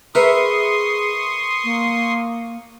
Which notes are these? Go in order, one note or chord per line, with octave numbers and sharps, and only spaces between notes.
G#4 A#4 B4 E5 C6 C#6 D#6
A#3